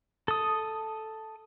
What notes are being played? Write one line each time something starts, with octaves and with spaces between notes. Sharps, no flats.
A4 D#6